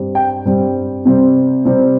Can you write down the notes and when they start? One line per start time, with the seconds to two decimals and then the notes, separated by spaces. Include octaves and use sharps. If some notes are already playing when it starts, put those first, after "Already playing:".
Already playing: G2 G3 C4
0.15 G5
0.45 G2 G3 C4
1.05 C3 G3 C4
1.65 C3 G3 C4